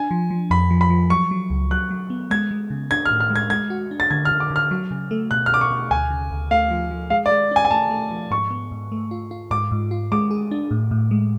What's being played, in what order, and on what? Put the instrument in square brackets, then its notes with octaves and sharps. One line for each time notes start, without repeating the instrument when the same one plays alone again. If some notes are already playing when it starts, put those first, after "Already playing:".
Already playing: [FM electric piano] D4 [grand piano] G#5
[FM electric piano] F3
F3
[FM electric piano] F2 [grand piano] B5
[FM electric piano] F3
[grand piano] B5
[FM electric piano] F3
[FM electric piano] F#3 [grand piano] C#6
[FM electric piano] F#3
C#2
[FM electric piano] F#3 [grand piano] F#6
[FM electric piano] F#3
B3
[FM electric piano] G#3 [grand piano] G#6
[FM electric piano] G#3
C#3
[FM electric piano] D4 [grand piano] G#6
[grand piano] F6
[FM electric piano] A2
[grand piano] F6
[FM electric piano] G#3
[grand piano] G#6
[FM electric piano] G#3 [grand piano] G#6
[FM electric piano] F#4
D4
[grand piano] A6
[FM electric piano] D3 [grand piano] G#6
[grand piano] F6
[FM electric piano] D3
[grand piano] D6
[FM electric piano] D3
[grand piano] F6
[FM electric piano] F#3
C#3
A3
[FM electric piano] B2 [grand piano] F#6
[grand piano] F6
[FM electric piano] B2 [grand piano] D6
[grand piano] C#6
[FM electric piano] B2
[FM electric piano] D2 [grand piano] G#5
[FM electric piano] C#3
D2
[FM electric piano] A3 [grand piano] F5
[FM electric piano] F3
F3
[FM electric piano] G#3 [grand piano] F5
[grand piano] D5
[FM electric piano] G#3
[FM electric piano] C#4 [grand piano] G#5
[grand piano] G#5
[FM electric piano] A3 [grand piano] A5
[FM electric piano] A3
F3
[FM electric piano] G#2 [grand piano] C#6
[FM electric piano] B3
G#2
A3
F4
F4
[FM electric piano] G#2 [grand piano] D6
[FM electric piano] G#2
F4
[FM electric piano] G#3 [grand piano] D6
[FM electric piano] G#4
D4
A2
A2
G#3